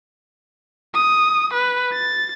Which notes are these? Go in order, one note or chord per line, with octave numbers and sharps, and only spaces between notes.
D#6
B4
A6